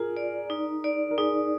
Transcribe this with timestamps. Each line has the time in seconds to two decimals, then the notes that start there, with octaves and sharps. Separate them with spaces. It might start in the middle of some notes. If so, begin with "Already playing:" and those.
Already playing: F4 G#4 A#4
0.17 D5
0.50 D#4
0.84 D5
1.11 A#4
1.18 D#4 G#4